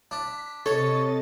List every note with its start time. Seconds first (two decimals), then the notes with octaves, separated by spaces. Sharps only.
0.11 D4 B6
0.66 C3 A4 C#5 D#5 A6